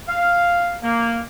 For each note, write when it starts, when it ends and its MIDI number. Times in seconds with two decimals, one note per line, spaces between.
0.08 0.73 77
0.82 1.20 58